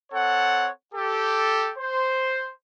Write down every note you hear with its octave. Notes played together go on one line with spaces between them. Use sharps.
C4 A4 C#5 F#5
G4 A4
C5